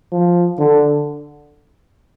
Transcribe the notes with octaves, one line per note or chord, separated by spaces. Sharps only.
F3
D3